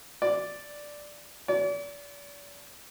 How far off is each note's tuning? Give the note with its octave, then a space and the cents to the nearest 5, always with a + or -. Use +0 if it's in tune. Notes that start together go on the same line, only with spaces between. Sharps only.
D5 +0
D5 -40